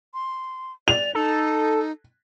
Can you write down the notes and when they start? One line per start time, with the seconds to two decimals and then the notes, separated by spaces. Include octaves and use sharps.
0.14 C6
0.88 D5 F7
1.15 D#4 A4